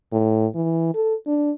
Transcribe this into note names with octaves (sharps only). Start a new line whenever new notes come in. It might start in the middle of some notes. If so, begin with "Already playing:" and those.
A2
E3
A4
D4